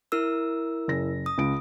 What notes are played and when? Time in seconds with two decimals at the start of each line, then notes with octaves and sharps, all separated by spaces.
0.12 E4 A#4 E6
0.88 F#1 A#6
1.26 D#6
1.38 C#2 D7